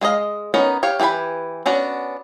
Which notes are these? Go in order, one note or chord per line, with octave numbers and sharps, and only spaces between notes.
G#3 F#4 G#4 D#5 F5
B3 C#4 D#4 A#4 D#5
G4 C#5 F5
E3 G4 B4 G#5 B5
B3 C#4 D4 F#4